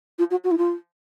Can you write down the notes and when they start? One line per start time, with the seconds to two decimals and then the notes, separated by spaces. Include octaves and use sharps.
0.19 F4
0.31 F#4
0.44 F#4
0.51 E4
0.58 F4